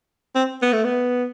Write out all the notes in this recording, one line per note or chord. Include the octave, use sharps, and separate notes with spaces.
C4
B3
A3
B3